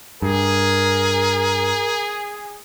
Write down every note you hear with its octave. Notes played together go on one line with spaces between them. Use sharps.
G2 G#4 A#4